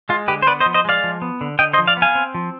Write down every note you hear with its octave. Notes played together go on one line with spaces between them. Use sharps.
G#3 F4
D3 G4 B4
C5
B3 B4 D5
C5 D#5
F3
C5 D#5
G#3 D5 F5
F3
B3
D3
D3 D#5 G5
C5 D#5
F3
D5 F5
B3
F5 G#5
C4
F3